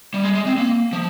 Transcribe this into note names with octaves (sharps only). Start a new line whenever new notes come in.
G3
G#3
G#3
C4
A#3
F3